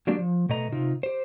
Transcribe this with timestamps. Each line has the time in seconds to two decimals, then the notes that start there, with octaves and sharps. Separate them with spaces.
0.07 F#3 G#3 A#3 D4 G4 D5
0.18 F3
0.49 B2 A3 D#5 A#5
0.72 C3 D#4 F4
1.03 G4 C5